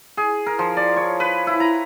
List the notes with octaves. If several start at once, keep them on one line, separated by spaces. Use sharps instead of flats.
G#4
A#4
F3
D5
C#5
B4
E4
A#5